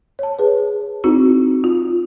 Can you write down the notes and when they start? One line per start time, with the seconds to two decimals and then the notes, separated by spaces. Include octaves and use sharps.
0.19 C#5 A5
0.39 G#4 B4
1.04 C4 D#4 E4 F#4
1.64 F4